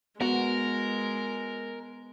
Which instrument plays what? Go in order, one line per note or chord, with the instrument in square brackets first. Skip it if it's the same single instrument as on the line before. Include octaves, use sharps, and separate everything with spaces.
[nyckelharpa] G#3 [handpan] B3 [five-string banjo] F#4 F#5 [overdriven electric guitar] A#4